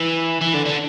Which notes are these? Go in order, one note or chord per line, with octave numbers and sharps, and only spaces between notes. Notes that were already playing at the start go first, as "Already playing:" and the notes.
Already playing: E3
E3
D3
D3